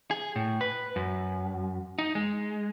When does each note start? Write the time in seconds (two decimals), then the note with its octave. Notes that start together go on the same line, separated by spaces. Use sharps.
0.11 G#4
0.36 A2
0.61 B4
0.96 F#2
1.99 D#4
2.15 G#3